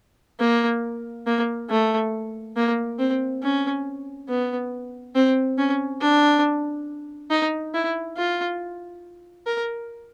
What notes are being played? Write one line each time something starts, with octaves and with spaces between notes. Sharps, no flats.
A#3
A#3
A3
A#3
C4
C#4
B3
C4
C#4
D4
D#4
E4
F4
A#4